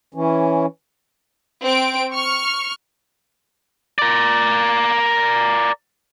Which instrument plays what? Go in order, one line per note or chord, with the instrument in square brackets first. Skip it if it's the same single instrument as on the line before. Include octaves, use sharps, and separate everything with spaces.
[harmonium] E3 C#4
[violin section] C4 D7
C#6 F6
[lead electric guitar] A#4 D5